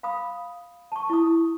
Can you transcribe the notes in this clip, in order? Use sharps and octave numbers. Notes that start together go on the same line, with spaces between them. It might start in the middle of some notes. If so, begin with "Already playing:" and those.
F5 B5 D#6
A5 C#6
E4 D#6